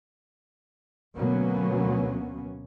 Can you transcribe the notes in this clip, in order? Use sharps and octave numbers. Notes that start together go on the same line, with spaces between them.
D2 B2 F#3 A#3 B3 C#4